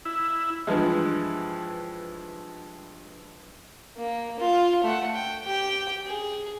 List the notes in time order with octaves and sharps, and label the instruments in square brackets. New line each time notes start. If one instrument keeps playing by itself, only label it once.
[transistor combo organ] E4
[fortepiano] G2 E3 F3 G#3
[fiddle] A#3
F4
A3 F#5
G5
G4 G5
G#4